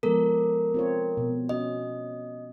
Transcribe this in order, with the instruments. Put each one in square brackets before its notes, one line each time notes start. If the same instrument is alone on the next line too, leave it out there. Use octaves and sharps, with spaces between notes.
[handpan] F3 G#3 B3 [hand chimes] A4 A#4
[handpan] C4 F4 C#5
B2
[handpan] C#4 F#4 [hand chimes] D#5